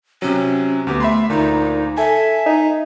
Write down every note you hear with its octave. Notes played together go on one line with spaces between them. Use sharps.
C3 F#3 C#4
D2 B3 G4
A3 E5 B5 C6
D2 A#2 D#4
A4 E5 G#5
D#4